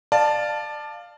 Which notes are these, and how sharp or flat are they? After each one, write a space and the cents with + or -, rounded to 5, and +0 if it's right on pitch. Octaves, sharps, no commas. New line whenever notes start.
D5 +25 F5 +0 A5 +0